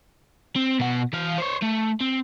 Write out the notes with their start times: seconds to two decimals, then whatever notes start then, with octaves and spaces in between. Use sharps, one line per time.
0.56 C4
0.79 B2 F#5
1.13 E3 F5
1.38 C5 C#5
1.62 A3
2.01 C4